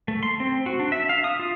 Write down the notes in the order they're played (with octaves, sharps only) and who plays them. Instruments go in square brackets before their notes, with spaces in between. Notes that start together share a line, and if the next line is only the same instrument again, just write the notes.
[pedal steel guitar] A3
C6
C4
F#4
D4
E5
F5
D#6
F4